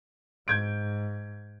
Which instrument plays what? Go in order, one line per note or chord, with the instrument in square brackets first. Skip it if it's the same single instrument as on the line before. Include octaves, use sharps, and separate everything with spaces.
[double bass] G#2 [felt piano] G6 G#6 D7